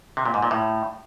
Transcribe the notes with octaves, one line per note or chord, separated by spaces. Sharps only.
C3
A#2
G#2
A#2
A2